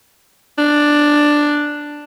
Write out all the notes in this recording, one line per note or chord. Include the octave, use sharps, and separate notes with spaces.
D4